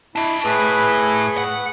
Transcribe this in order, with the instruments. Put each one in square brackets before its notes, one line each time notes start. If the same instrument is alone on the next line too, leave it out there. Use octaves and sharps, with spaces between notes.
[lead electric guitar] D4 D#5 [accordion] E4
[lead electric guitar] A2 [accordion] G#4 B4
[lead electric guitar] F#5